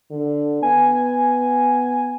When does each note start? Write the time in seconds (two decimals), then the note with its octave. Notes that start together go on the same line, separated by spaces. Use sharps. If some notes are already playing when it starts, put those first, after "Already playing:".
0.11 D3
0.62 B3 G#5